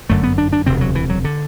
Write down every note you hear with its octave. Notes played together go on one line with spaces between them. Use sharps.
G1 F#2 D3 A3
B3
D4
D4
E1 D2 C3 C4
F#3
E3
F#3
D3